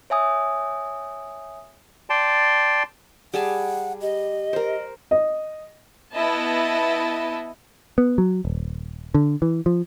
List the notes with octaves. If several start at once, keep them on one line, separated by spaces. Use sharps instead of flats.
C#5 E5 G#5 D#6
D5 G5 A5 C6
G3 G#4 F#5 A5
G4 D#5
A#4 C5
D#5
B3 E4 D#5 A5
B3
F#3
D#1
D3
E3
F3